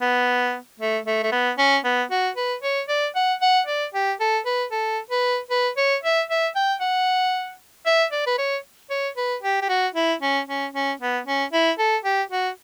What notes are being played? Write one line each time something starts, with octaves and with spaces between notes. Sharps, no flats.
B3
A3
A3
A3
B3
C#4
B3
F#4
B4
C#5
D5
F#5
F#5
D5
G4
A4
B4
A4
B4
B4
C#5
E5
E5
G5
F#5
E5
D5
B4
C#5
C#5
B4
G4
G4
F#4
E4
C#4
C#4
C#4
B3
C#4
E4
A4
G4
F#4